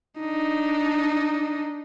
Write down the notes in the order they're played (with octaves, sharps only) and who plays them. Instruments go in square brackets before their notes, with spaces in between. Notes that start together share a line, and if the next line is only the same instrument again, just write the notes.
[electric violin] D4 D#4